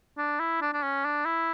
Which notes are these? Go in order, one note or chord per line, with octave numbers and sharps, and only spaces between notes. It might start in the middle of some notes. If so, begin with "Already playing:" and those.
D4
E4
D4
D4
C#4
D4
E4